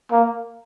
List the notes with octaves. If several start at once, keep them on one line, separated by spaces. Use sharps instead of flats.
A#3